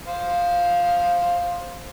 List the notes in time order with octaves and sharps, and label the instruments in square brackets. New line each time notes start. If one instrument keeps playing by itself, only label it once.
[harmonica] C5 F5